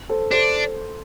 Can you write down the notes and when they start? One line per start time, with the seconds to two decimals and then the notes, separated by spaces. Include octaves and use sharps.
0.09 A4 C5
0.31 D4 A4 C5